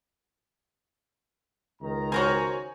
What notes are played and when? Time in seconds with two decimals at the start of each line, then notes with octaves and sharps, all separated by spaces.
1.82 C#2 D#3 A#5
2.12 F#4 A#4 C5 C#5 G#5